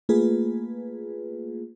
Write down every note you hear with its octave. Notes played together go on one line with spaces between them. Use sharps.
A3 A#3 F4 G#4 B4